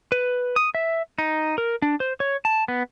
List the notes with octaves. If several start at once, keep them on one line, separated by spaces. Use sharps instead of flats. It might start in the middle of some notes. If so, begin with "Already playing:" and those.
B4
D#6
E5
D#4
A#4
D4
C5
C#5
A5
B3